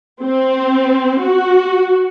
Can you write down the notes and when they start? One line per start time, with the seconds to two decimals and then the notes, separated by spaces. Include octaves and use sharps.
0.21 C4
1.22 F#4